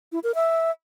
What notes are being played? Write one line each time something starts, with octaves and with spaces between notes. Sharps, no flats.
E4
A#4
E5